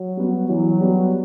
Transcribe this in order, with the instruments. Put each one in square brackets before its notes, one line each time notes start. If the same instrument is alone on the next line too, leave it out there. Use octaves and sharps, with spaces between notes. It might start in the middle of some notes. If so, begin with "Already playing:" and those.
Already playing: [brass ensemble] F#3
[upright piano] G3 B3 F#4
[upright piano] E3 [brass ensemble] F#3
[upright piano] G3 B3 F#4